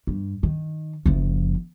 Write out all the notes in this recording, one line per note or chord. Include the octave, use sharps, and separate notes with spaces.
G2
D#3
F#1 F3